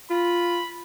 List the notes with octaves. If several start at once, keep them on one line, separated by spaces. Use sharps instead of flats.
F4 B5